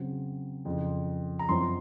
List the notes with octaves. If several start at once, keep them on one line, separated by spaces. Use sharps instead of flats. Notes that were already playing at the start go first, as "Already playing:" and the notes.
Already playing: C#3 F#3 C4
F2 C#3 F3
A#5
F#2 F3 C4 C6